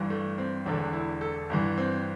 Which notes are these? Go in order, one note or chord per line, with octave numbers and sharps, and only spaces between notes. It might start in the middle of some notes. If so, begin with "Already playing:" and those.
Already playing: G1 G2 E3
A3
C4
E1 E2 D3 D4
E4
A4
G1 G2 E3
C4